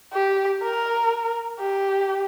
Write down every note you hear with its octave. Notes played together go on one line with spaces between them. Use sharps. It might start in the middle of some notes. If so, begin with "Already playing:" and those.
G4
A#4
G4